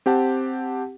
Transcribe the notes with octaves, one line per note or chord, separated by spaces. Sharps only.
C4 G4 F#5 A5